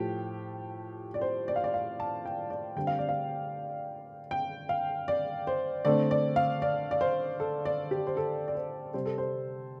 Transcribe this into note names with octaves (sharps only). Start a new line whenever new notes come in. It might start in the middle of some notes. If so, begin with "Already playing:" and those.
Already playing: A2 F3 A3 G4
D5
C5
D5
F5
D5
F5
A5
G5
D5
D3 G3 C4 G5
F5
D5
F5
G5
F5
D5
C5
D3 A3 C4 D5
D5
F5
D5
D5
C5
A4
D5
G4
C5
A4
D5
C5
C3 G3 C4 C5
A4
C5